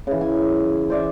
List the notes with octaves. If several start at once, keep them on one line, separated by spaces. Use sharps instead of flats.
C#3 E3
G#5
C5 D5 E5